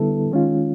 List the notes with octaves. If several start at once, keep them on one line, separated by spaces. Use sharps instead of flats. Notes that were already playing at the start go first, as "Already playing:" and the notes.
Already playing: D3 G3 B3 E4 A4
D#3 G#3 C#4 F4